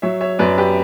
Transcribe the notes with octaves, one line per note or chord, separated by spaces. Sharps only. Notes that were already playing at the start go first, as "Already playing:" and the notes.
F#3 C#5 E5
C#5 E5
F#2 B4 D5
G4 B4